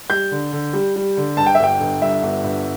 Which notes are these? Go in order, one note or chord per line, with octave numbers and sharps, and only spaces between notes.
G3 G6
D3
D3
G3
G3
D3
G2 A5
G5
E5
G1 G5
G1
G2 E5
G1
G2